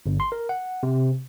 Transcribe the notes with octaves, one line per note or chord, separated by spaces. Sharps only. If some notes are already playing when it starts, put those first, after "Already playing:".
G1
C6
A#4
F#5
C3